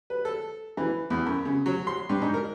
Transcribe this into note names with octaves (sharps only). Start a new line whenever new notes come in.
B4
A4
E3
E2
F#2
C#3
F#3
C6
G2
G#2
A#4